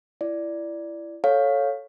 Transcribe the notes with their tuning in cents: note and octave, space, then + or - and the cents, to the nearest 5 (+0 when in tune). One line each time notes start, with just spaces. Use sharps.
E4 +25 D5 +0
A4 +0 C#5 +0 F5 +10